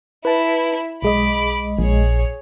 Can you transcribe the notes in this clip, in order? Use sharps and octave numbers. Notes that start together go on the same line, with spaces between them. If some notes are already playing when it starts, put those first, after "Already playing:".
E4 B4 A5
B1 G#3 D#5 B5 D6
A#1 G#4 C#5